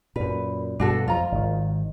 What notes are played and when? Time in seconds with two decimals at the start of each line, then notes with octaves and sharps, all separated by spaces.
0.16 F#2 A#2 B4
0.80 G2 B2 D4 F#4 A4
1.08 F2 F3 F4 A#5
1.32 G#1 D#3